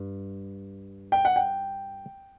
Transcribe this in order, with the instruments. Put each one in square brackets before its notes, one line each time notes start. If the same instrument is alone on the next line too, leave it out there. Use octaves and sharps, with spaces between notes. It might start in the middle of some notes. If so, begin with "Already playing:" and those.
Already playing: [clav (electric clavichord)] G2
[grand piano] G5
F#5
G5